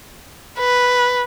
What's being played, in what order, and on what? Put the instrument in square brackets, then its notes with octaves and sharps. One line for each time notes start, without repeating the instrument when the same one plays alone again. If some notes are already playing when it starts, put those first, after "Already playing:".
[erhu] B4